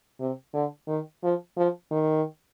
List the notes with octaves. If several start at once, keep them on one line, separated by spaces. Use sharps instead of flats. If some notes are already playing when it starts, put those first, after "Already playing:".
C3
D3
D#3
F3
F3
D#3